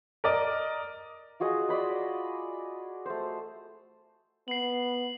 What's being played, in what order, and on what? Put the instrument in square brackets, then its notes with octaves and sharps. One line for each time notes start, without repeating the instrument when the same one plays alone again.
[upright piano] A#4 D5 D#5
[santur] F4 F#4 G#4 D#5
D5 D#5 B5 C6
A3 C5
[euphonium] B3 [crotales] C7 F#7